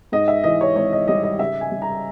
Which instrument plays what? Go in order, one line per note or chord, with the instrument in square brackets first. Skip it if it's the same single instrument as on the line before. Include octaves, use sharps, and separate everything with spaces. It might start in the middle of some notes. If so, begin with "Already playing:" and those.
[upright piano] G#2 D#5
E5
E3 D#5
C#5
G#1 C#5
D#5
G3 D#5
D#5
C#3 E5
G#5
G3
A#5